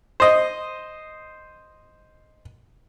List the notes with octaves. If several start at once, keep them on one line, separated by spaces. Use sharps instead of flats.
C5 D#5